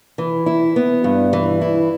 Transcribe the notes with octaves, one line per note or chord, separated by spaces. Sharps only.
E3
E4
B3
G2
E3
E4